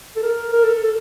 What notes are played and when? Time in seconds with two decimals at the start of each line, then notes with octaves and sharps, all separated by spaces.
0.16 A4
0.23 A#4
0.53 A#4
0.64 A4
0.84 A4